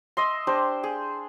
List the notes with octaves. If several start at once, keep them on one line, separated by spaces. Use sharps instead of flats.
D#5 E5 C6
D4 G4 C5
G#4